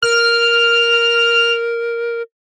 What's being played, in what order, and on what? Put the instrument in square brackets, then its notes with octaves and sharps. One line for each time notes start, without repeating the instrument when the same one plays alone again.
[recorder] A#4 [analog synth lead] F6